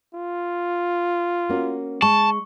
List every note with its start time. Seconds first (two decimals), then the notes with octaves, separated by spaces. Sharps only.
0.14 F4
1.49 A#3 C#4 F#4
2.02 G#3 A5 C#6